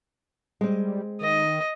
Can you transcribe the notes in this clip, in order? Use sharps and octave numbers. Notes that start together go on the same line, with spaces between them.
G3 G#3 C4
D#3 D#5